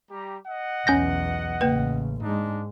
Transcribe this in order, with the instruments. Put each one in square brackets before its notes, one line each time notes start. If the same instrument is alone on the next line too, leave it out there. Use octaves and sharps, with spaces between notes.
[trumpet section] G3 G4 A#5
D#5 F#5
[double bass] B1 E2 [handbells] C#4 G6 A#6
[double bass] A1 C#3 [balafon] A#3 B4
[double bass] G#2 G#3 [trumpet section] D4 D#4